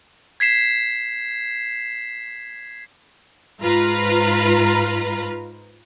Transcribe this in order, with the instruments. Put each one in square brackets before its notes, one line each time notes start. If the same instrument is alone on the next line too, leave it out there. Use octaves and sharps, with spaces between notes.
[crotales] G#6 B6 C7 E7
[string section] G#2 F4 B4 A#5